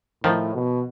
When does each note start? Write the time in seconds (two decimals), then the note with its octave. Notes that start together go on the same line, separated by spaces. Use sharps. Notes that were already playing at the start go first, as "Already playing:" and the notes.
0.23 A2 D#3 F3
0.54 B2